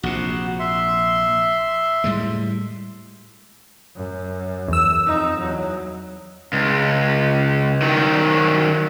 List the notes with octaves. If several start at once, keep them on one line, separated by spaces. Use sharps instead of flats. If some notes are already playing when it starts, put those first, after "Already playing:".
A#1 C3 F#4
E5 C6
A2 G3 G#3
F#2
E2 E6
F2 D#4
E2 F#3
C#2
D#3 F#3